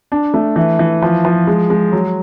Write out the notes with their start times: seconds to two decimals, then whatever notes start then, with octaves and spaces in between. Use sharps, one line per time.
0.12 D4
0.34 A3
0.56 E3
0.79 E3
1.02 F3
1.25 F3
1.47 G#3
1.70 G#3
1.92 F#3